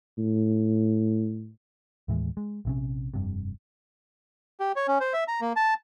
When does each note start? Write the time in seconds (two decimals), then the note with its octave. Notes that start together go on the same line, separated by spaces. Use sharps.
0.18 A2
2.08 D#2 A2 E3 G#3
2.37 G#3
2.65 A#1 C3 C#4
3.14 F1 G2 C3
4.60 G4
4.76 C#5
4.88 C#4
5.00 C5
5.13 E5
5.28 A#5
5.41 A#3
5.56 A5